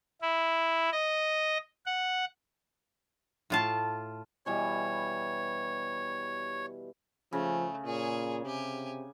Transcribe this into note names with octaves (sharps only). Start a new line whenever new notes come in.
E4
D#5
F#5
A2 F4 A5
B2 E3 G3 C#5
C#3 F3 A3
A#2 G#4 C#5
C3 G4 G#5